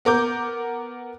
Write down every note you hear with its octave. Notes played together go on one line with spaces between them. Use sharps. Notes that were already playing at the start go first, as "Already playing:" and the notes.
B3 A#4 D6 G6